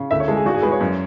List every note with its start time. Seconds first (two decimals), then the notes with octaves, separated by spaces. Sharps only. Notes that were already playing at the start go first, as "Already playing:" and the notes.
Already playing: C#3
0.11 D2 E5
0.20 C#5
0.28 G#3 A4
0.37 G#4
0.45 G#1 F#4
0.54 G#4
0.63 G#3 B4
0.72 C#5
0.81 F#2